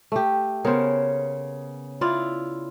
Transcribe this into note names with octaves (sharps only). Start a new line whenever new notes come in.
A3 G4
C#3 B3 A#4 C5
E4 F4 D5